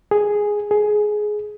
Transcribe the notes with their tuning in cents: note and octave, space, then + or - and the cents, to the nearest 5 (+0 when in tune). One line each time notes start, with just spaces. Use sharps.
G#4 +0
G#4 +15